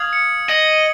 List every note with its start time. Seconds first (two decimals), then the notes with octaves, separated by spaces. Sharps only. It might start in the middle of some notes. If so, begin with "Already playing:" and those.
Already playing: F5 D#6 G#6
0.13 C#7
0.49 D#5 F#7